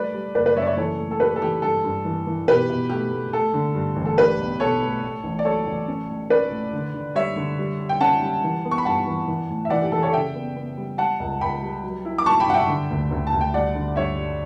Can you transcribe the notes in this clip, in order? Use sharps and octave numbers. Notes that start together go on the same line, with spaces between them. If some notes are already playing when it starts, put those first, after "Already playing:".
Already playing: G3 A3 B4 D5
G3
F#1 B4 D5
B4 D5
F#2 C#5 E5
D5
C#5 E5
E3 A4 C#5
A3
A4
A2 G4 B4
A4
E3 G4
G2 A4
G2
E3
E3
B2 G4 B4
B2
A3 G4
A3
A3 A4
D3
G2
A1
A4
D4 G4 B4
B1
B2 A4 C#5
A3
A2
A1
D5
F#3 A4 C#5
A1
C#4
A2
C#4 B4 D5
A2
D3
D3
G3 C#5 E5
D3
G3
G3
G5
C#4 F#5 A5
G3
E3
B3
C#6
B5
G2 F#5 A5
E3
E3
A2
E5
E3 D5 F#5
G4
E3 A4
A4 C#5
C#3 E5 G5
B3
B3
G3
G3 F#5 A5
C#2
C#2 G5 B5
G3
F#3
E4
D6
F#3 A5 C#6
G5 B5
G2 F#5
E5 G5
D3
D2
D2
A5
D2
G5
G3 D5 F#5
D3
G2 C#5 E5
G3